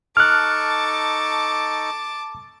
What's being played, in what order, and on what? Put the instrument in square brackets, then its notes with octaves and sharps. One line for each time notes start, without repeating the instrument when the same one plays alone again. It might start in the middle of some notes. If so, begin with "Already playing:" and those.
[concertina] D#4 A4 C#6 [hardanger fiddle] A5 D6 [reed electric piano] F6 F#6